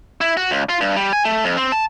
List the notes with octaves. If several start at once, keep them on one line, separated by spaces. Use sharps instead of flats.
E4
F#4
C#2
F4
G2
G3
G#5
A3
F2
C4
A5